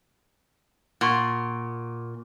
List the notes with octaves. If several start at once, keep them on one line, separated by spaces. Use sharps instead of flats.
A#2 F#5 C6 C#6